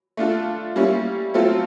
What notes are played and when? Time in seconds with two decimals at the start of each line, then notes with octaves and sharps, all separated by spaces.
0.17 A3 D4 F4 A4
0.76 G3 A#3 C#4 E4
1.34 F#3 A3 C4 F4 A4